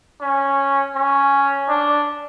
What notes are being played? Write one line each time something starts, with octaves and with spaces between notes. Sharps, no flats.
C#4
C#4
D4